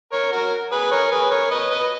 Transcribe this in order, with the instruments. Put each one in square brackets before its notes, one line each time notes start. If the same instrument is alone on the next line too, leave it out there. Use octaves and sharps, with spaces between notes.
[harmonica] A#4 C#5
F#4 A#4
G#4 B4
A#4 C#5
G#4 B4
A#4 C#5
B4 D#5
B4 D#5